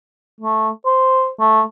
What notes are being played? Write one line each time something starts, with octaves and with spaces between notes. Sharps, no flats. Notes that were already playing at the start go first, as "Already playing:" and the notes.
A3
C5
A3